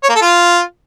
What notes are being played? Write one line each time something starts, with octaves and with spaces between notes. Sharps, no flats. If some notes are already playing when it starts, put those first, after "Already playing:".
C#5
A#3
A4
F4